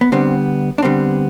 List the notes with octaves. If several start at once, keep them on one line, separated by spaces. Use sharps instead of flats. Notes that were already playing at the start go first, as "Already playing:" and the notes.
B3
D3 G3 B3 C4
D4
D3 G3 B3 C4